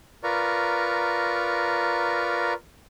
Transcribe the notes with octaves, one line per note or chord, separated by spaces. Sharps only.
F4 A#4 B4 D5 A#5 C#6